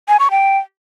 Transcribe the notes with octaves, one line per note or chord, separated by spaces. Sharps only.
G#5
C#6
G5